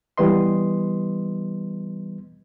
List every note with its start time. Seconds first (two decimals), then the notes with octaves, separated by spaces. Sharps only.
0.18 E3 G3 B3 B4 D#5 C6